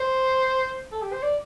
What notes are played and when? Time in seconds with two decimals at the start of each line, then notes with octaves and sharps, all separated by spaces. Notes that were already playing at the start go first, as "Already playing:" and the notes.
Already playing: C5
0.92 A4
1.02 G4
1.12 C5
1.23 D5